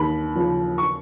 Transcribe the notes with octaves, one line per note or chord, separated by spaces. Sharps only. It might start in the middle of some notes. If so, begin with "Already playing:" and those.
Already playing: D#2 B5
C#3 F3
C#6